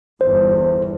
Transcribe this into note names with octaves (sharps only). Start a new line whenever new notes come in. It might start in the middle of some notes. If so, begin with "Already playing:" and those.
G1 E2 C5